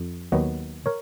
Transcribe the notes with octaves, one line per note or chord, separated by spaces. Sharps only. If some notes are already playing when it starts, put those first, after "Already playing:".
Already playing: F2
D#2 D#3 F#3 B3
A#4 C#5